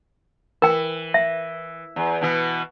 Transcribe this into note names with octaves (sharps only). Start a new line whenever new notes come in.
E3 A#4 G5
E5
E2
B2 E3 B3